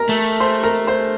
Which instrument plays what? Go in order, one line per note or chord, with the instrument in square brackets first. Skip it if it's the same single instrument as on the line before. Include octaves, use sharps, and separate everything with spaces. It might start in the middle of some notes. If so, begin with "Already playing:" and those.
Already playing: [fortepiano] A#4 A#5
[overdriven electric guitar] A3
[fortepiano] C5 C6
A#4 A#5
C5 C6